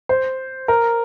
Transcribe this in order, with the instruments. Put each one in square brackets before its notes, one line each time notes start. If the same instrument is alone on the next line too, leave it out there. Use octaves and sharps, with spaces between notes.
[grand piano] C5
A#4